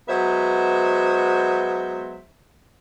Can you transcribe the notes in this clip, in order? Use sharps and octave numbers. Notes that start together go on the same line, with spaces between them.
F#3 G#3 B3 C5 E5